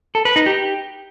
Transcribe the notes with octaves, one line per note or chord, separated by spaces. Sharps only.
A4
B4
D#4
G4